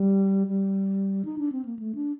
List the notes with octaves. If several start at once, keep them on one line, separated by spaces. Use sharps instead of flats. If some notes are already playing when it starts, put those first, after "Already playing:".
Already playing: G3
G3
D#4
D4
C4
A#3
A3
D4